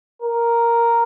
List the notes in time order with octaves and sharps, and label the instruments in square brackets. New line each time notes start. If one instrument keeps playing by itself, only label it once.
[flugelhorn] A#4